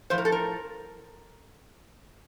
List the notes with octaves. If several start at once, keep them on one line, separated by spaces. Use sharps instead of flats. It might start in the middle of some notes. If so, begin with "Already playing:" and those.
A2 F3 C5
A#4
A4
A#4